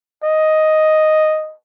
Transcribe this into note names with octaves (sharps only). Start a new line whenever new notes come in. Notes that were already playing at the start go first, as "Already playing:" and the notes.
D#5